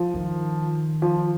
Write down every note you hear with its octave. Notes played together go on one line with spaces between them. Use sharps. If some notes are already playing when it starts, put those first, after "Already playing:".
Already playing: F3
D#3
F3